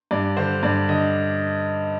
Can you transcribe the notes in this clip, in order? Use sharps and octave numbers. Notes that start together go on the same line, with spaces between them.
G2 D5
D3 C5
G2 D5
D3 D#5